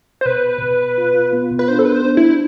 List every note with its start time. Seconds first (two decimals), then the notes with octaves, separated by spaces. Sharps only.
0.21 C5
0.26 B2 B4
0.62 B2
0.98 F4
1.33 B3
1.59 B4
1.68 D4 C5
1.79 A4
1.85 B4
1.92 C5
2.05 D4
2.17 E4